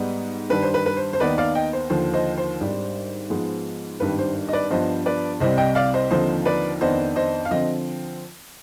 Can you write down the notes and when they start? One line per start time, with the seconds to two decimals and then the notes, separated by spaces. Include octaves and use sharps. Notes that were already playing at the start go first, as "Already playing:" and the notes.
Already playing: G#2 G3 B3 D#4
0.50 G2 D#3 G3 B4
0.63 C5
0.74 B4
0.86 B4
0.97 C5
1.13 C5
1.20 D#2 D#3 B3 D#4 B4 D5
1.38 D5 F5
1.55 D#5 G5
1.73 C5
1.90 D#2 D3 F3 C5
2.13 C5 D#5
2.38 C5
2.60 G#1 G#2 G3 D4
3.30 G#2 F3 G#3 B3
4.00 G#1 G2 D#3 G3 B4
4.19 C5
4.49 D#5
4.53 B4 D5
4.70 G2 F3 B3 D4 C5 D#5
5.06 B4 D5
5.40 C2 C3 G3 C4 C5 D#5
5.58 D#5 G5
5.75 D5 F5
5.94 C5 D#5
6.11 D#2 D3 F3 C4 D#4 C5
6.45 B4 D5
6.81 F2 D#3 B3 D4 C5 D#5
7.16 C5 D#5
7.45 F5
7.50 D3 F3 C4 D#5